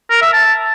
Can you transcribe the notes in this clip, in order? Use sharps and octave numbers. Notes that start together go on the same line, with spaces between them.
A#4
E5
A5